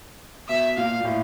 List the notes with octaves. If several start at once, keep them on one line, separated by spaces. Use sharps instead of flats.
B2 E5
A#2 F5
A#2
A2